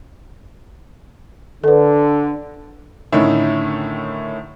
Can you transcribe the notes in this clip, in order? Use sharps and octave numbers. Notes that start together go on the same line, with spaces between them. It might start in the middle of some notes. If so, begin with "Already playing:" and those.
D3 A4 B4
A2 D3 D#3 C#4 D#4 E4